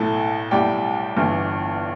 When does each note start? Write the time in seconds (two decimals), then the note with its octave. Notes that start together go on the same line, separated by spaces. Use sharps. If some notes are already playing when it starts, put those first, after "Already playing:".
Already playing: B1 A2 A3
0.51 B1 A2 G3 D5 G5
1.16 G1 G2 E3